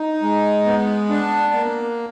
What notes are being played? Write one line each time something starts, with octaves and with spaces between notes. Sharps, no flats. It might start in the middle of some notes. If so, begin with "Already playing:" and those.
Already playing: D#4
G#3
B3
D4
A#3